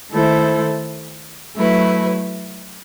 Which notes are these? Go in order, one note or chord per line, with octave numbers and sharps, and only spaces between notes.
D#3 A3 E4 A4 C5
F#3 A3 E4 B4